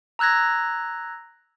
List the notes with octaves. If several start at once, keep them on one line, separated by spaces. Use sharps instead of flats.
A#5 E6 F#6 G#6 A#6